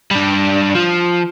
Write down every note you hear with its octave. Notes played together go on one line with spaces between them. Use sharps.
G3 D4
F3